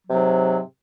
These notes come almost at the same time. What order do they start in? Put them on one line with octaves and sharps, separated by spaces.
F#3 C3 G#2